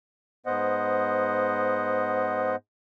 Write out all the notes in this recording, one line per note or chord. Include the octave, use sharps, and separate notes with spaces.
G#2 B3 C5 D#5 F#5